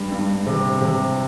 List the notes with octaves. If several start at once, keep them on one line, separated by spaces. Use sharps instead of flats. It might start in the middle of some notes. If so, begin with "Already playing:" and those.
Already playing: G2
G2
C3
C3